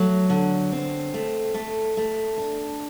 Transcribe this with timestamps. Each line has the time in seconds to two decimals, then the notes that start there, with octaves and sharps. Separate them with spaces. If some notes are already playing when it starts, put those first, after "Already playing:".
Already playing: F#3 A3
0.30 D3
0.72 C4
1.14 A3
1.54 A3
1.97 A3
2.38 D4